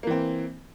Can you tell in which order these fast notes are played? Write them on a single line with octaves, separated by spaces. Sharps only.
A#3 E3 C4